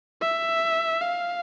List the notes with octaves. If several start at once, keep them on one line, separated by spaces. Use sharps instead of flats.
E5
F5